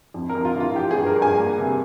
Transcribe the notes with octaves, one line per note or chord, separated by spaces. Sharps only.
F2
A#4
F2
F4
E3 F4
F3 G4
G#4
G2
A#4
G2
G#5
A#3
C3